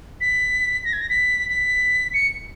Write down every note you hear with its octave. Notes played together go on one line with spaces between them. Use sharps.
B6
A#6
G#6
A#6
B6
B6
C#7